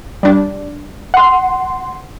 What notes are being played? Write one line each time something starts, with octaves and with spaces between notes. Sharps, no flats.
G3 D4
F#5 C6